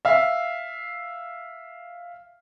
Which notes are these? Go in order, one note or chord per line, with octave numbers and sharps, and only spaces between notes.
E5 F5